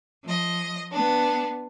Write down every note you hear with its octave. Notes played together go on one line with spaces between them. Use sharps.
F3 D#5
B3 D4